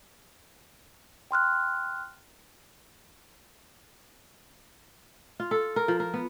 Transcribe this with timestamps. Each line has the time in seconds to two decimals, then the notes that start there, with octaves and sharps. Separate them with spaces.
1.31 G5 C6 F6 F#6
5.40 F4
5.51 A4
5.76 A#4
5.88 F3
6.00 A#4
6.14 B3